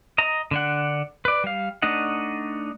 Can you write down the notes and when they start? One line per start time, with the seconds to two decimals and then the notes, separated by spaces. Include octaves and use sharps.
0.18 D#5 A#5
0.51 D3 D4 F#5
1.25 B4 D5
1.44 G3 F5
1.82 A3 D4 D#4 D#5 F#5